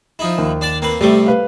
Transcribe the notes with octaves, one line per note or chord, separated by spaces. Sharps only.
F3 D#4 E4
D#2
D4 D5 A5
A#3 C4 B4
A2 C3 G3 A3
B4 F5